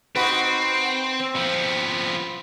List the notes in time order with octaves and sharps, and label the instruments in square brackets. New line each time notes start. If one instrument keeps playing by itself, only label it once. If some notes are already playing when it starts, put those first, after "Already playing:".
[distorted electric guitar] C4 [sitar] D#4 F#4 B4
[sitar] C4
[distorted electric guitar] F3 B3